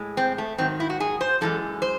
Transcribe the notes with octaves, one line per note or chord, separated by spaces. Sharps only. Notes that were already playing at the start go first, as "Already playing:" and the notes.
Already playing: A2 G#3
C4
A3
G#2 D#3 F#3 C4
E4
F#4
G#4
C5
F#2 E3 G#3 A4
C5